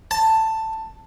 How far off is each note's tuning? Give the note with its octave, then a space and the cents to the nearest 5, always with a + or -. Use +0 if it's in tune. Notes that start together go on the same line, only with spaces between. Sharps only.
A5 +10